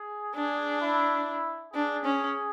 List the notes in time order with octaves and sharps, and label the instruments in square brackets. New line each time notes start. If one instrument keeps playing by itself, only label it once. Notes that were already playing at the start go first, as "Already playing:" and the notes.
Already playing: [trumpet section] G#4
[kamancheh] D4 [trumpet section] G#4
[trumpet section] E4
[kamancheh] D4 [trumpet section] G#4
[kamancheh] C#4